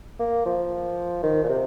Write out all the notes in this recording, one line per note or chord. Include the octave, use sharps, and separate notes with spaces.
A#3
F3
D#3
A#2
C3